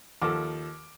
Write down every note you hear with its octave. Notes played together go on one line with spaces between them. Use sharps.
D#2 F3 A4 D6